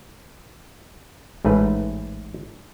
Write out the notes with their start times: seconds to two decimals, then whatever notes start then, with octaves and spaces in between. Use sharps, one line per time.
1.45 A1 G#2 A3 B4